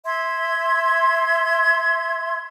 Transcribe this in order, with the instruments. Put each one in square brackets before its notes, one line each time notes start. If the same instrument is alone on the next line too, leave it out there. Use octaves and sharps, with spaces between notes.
[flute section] E5 C6 G#6